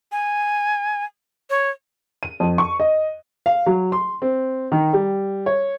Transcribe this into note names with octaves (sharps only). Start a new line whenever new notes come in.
G#5
C#5
D#7
F2
C#6
D#5
F5
F#3
C6
C4
D#3
G3
C#5